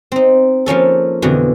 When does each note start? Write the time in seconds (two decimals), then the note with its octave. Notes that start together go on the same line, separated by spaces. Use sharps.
0.12 C4 D#4
0.66 F3 A#3 C#4 A4
1.22 F2 B2 D3 E3